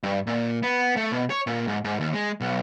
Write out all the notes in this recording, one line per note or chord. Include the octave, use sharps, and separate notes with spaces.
G2
A#2
B3
A3
B2
C#5
A#2
G#2
G#2
D#2
G#3
B1